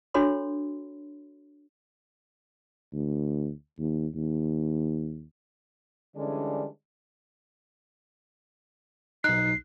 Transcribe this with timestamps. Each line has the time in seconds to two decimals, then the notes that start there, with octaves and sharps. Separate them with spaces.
0.14 D4 F#4 A4 C#5 B5 C6
2.92 D2
3.78 D#2
4.15 D#2
6.16 D3 E3 G3 G#3 C#4 D4
9.24 B1 D#4 F#6 C7